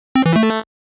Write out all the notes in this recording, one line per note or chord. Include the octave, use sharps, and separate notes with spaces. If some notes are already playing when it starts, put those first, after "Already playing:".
C4
E3
A3